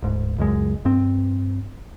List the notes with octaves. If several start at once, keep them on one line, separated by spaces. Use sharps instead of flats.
D1 G#2
C#2 F#2 G#3
G2 C4